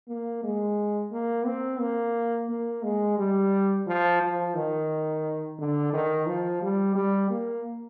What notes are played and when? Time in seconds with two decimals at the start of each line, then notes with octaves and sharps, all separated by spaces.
0.08 A#3
0.43 G#3
1.12 A#3
1.46 C4
1.80 A#3
2.49 A#3
2.83 G#3
3.18 G3
3.87 F3
4.21 F3
4.55 D#3
5.59 D3
5.93 D#3
6.27 F3
6.62 G3
6.95 G3
7.30 A#3